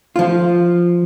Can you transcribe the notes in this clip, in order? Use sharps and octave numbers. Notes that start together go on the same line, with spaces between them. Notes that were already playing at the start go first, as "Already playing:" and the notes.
F3 F4